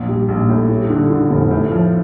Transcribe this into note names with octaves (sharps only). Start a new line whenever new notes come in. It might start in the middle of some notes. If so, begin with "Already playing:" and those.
Already playing: A#1
G3
A#1
A2
G3
D3
D3
F1
A2
F3